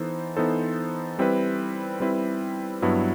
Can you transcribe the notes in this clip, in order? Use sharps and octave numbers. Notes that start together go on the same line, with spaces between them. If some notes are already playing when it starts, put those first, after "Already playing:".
Already playing: E3 B3 D#4 A4 C5
E3 B3 D#4 A4 C5
G3 C4 E4 B4
G3 C4 E4 B4
G2 F#3 B3 E4